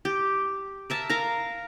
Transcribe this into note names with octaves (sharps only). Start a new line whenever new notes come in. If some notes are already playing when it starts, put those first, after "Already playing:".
G4
A#4 E5 A5
A#4 F5 A#5